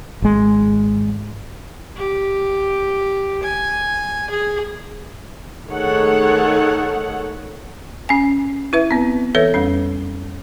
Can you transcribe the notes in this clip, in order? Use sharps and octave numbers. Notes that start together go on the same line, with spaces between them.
G#1 G#3
G4
G#5
G#4
D#3 A3 G#4 A4 C#5 F#5
C#4 G#5
E4 B4 E5
B3 C4
E3 A4 B4 C#5 E5
F2 G3 C#4